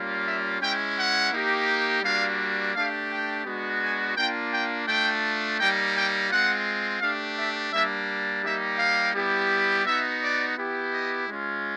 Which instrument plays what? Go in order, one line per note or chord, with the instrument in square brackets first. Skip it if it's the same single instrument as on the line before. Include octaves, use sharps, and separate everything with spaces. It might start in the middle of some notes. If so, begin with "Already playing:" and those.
Already playing: [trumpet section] G3 A#3 C#4 F4
E5
G#3 C#4 E4 G5
F#5
A#3 D#4 G4
G3 A#3 D4 F#4 F5
A3 D4 G4 F5
G5
G#3 B3 D4 F#4
G#5
A#3 D4 F4 G5
G5
A3 D4 F4 G5
G3 A#3 D#4 G5
G5
G#3 C4 F4 F#5
A3 D4 G4 F5
E5
G3 A#3 D4 E5
G3 A#3 D#4 G4 E5
F5
G3 B3 E4 G4
B3 D#4 F#4 E5
D5
B3 E4 G4
D#5
G#3 C#4 F4